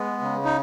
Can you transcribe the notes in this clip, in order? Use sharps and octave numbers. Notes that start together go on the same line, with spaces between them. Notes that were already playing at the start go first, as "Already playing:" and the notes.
Already playing: G#3 B3
C#3
D#4